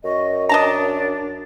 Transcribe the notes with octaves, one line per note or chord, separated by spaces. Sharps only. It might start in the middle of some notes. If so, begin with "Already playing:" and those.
F#2 D#5 C#6
D4 D#5 A5 A#5